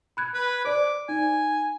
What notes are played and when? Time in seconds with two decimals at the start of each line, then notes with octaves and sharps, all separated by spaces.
0.17 B5 F#6 G#6
0.34 B4
0.65 C5 D5 D6
1.09 D#4 G#5